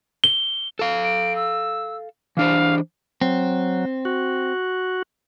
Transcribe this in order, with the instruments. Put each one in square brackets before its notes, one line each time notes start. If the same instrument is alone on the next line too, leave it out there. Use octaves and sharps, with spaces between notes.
[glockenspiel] G7
[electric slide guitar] A4 F5
[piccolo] D7
E6
[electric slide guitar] E3 D4 C5 [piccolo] F5
[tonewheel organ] F#3 [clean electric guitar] C4
[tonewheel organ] F#4